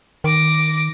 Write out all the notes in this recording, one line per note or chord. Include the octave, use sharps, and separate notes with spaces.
D#3 D6 A#6